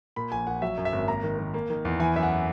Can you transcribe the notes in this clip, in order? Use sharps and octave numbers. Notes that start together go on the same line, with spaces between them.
A#2 B5
A#1 G#5
A#1 F#5
F#3 E5
F#2
E5
G#1
A#3 A#5
D#3
D#3
A#3
D#3
E2
E3 G#5
F#2 E5
F#5